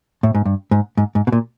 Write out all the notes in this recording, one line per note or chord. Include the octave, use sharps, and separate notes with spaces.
A2
G#2
G2
G#2
G#2
G#2
B2
A#2